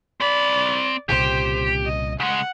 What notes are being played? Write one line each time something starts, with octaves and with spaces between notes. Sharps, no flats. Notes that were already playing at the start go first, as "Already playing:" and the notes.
C4 D5 B5
C2 A#2 C#3 G4 C5
D#5
C#3 G#3 F#5